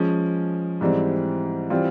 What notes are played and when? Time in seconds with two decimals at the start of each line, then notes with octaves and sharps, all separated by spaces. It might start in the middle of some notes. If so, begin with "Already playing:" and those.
Already playing: F3 G#3 C#4
0.81 G#2 E3 G3 C4
1.70 E3 G3 C4 F4